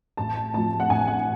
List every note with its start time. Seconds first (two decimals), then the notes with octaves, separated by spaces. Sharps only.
0.17 A1 A5
0.53 A2 F3 A5
0.80 F#5
0.89 A1 G#5
1.07 F#5